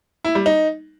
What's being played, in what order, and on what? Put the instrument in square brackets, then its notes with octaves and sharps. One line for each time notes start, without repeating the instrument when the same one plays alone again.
[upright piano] E4
G3
D#4